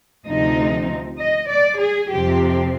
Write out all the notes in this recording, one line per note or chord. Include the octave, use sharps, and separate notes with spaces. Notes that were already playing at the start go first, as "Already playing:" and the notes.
D2 C3 F3 C4 D#4 D#5
D#5
D5
G#4
F2 C3 F3 C4 G4